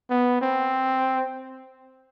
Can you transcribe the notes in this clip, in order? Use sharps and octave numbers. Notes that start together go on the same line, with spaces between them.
B3
C4